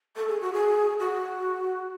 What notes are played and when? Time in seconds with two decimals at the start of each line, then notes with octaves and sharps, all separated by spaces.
0.16 A4
0.28 G#4
0.41 F#4
0.53 G#4
0.99 F#4